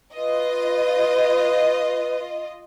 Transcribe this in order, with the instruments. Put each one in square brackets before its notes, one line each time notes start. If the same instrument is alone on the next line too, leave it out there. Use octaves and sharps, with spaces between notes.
[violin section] F4 D#5 [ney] B4